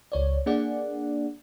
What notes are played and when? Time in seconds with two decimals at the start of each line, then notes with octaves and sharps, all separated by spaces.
0.12 C#2 C#5 D5
0.46 A#3 D4 G#4 D5 F#5